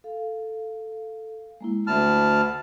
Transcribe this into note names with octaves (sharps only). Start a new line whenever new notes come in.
A4 F5
G#3 A#3 E4
D2 A5 B5 F6